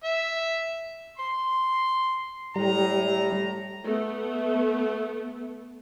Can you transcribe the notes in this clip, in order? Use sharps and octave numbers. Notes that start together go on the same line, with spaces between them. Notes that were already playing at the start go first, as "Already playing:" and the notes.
E5
C6
A2 G3 A#5
A3 B3